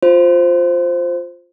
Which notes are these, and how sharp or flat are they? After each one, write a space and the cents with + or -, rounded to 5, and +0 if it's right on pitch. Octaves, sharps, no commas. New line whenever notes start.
F4 +5 C5 +0